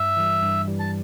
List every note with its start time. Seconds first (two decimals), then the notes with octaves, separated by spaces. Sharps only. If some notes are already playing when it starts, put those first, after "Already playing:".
Already playing: G2 E5
0.17 E3 G3
0.42 G2
0.67 E3 G3
0.79 A5